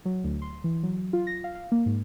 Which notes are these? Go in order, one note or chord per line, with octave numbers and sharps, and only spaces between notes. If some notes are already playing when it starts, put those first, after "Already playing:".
F#3
D2
C6
E3
F#3
F4
A#6
F5
F5
A#3
G#2